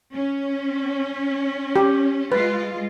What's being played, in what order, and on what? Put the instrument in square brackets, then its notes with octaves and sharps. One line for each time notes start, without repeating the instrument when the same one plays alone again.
[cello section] C#4
[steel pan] G4
[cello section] G#3 F4 [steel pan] B4